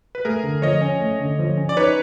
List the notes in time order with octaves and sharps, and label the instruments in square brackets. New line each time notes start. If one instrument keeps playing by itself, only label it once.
[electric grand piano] B4
[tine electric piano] A3 [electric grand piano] G#4 A#4
[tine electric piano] D3
[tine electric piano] F3 [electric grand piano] C#5 D#5
[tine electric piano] C#4
A3
D3
F3
C#4
[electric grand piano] D5
[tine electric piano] D#4 [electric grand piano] B4 C#5